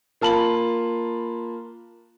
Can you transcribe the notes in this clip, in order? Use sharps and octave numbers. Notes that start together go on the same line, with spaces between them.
A#3 F4 A5 B5 F#7